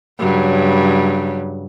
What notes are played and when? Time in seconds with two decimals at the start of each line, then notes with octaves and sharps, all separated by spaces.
0.19 G2 C#3 F#3